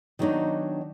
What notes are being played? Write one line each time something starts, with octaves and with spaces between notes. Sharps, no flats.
D#3 F#3 G3 B3 D4 D#4